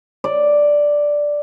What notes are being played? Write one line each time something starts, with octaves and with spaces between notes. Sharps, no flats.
D5